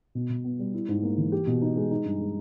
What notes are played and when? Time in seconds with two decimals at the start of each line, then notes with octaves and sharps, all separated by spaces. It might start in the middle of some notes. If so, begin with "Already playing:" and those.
0.15 B2
0.30 B2
0.44 B3
0.59 G3
0.74 E4
0.88 G#2
1.03 A#3
1.18 E3
1.32 G4
1.47 B2
1.62 D#4
1.77 G#3
1.91 D#4
2.05 G2
2.20 G#3